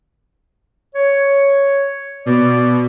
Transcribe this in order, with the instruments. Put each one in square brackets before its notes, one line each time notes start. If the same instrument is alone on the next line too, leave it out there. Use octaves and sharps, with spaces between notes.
[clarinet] C#5
[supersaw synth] B2 [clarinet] D5